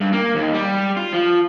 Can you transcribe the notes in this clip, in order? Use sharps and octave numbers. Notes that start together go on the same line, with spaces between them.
G2
A#3
D#2
G3
F4
F3